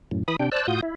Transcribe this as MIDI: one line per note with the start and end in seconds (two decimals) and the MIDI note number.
0.11 0.23 42
0.11 0.23 45
0.28 0.36 52
0.28 0.36 83
0.28 0.36 87
0.40 0.49 48
0.40 0.49 62
0.40 0.49 79
0.52 0.67 72
0.52 0.67 74
0.52 0.67 81
0.52 0.67 88
0.52 0.67 90
0.68 0.81 45
0.68 0.81 65
0.68 0.81 66
0.68 0.81 87
0.68 0.81 91
0.83 0.95 64